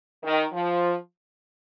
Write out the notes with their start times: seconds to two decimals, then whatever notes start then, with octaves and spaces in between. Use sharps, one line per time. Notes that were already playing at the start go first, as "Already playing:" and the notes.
0.24 D#3
0.53 F3